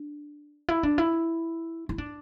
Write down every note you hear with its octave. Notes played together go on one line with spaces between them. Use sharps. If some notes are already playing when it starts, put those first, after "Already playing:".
Already playing: D4
E4
D4
E4
E4
D4